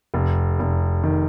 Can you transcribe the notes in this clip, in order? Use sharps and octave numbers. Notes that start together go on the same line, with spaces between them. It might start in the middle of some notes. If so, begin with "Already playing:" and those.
F1
F1
D#3